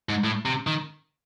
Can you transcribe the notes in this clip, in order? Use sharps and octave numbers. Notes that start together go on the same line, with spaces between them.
G#2
A2
C3
D#3